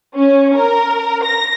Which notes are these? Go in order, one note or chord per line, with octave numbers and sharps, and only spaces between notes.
C#4
A#4
A#6